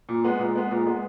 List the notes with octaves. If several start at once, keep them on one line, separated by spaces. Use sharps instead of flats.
A#2
G#3 B3
A#2
G#3 B3
A#2
G#3 B3